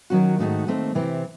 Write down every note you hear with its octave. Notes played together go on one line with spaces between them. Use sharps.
D#3 F#3 C#4 F#4
G#2 D#3 A3 D#4 F#4
D#2 D#3 A3 C4
C3 E3 C4 E4